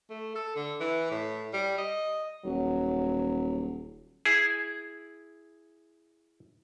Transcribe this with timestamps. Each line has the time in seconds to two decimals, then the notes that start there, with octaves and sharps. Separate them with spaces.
0.10 A3
0.35 A4
0.56 D3
0.80 E3
1.11 A2
1.53 G3
1.78 D#5
2.45 D#1 F#3
4.25 E4 G#4